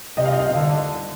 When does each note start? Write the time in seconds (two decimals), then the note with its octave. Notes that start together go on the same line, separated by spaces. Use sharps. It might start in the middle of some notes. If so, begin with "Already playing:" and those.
0.17 C3 D#5
0.25 F5
0.32 D#5
0.39 F5
0.46 D#5
0.53 D3 F5
0.60 D#5